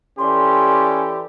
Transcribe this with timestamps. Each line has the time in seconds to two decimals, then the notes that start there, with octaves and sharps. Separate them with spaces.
0.18 E3 C#4 G4 A4 D5 C6